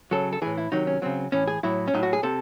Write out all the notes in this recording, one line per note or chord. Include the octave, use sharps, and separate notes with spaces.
C#3 F#3 A4
A4
A2 E3 G#4
E4
C3 D#3 F#3 D#4
C#4
C#3 F#3 C4
A2 E3 C#4
G#4
A2 F#3 E4
C#4
A2 F#3 D#4
F#4
G#4
C3 A4